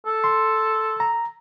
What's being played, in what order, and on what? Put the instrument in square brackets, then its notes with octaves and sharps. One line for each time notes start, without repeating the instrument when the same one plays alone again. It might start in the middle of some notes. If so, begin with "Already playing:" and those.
[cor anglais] A4
[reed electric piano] C6
A#5